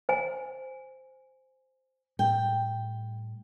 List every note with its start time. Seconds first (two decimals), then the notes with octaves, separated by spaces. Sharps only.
0.09 C5 G#5
2.19 A2 G3 G5